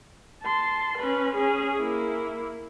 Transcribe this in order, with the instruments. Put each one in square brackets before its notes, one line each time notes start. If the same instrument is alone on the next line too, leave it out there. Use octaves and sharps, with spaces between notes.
[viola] A5 C6
C#4 B4
C#4 G#4
A#3 E4